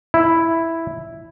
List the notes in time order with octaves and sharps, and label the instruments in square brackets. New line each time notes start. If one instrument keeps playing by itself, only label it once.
[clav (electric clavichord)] E4